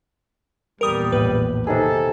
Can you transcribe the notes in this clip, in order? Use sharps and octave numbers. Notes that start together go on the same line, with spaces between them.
A#1 E2 G3 A#4 D#6
A2 B4
C3 D#3 G#4 A4